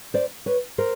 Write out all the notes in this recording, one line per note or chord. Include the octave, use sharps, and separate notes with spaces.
C5 D5
B4 C#5
A#4 C5